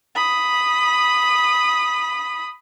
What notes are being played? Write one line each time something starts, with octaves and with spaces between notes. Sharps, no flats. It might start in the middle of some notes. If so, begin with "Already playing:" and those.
B5 D#6